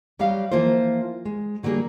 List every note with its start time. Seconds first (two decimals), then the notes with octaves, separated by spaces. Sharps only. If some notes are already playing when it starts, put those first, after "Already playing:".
0.19 F#3 G3 G4 D#5 F5
0.52 E3 F3 A#3 F4 C5
1.26 G#3
1.63 D3 F#3 G3 A#3 G#4